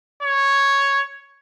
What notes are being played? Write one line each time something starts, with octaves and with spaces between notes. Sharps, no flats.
C#5